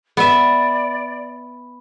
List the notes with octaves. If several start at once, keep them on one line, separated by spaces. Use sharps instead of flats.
B3 D5 E5